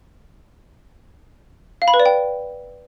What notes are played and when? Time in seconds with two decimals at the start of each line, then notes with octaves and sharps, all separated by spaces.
1.82 F5
1.88 B5
1.94 B4
2.00 D5
2.06 G5